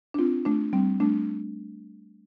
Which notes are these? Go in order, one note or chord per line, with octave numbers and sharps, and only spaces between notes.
D4
C4 F4
A3 D4
G3 C4
A3 D4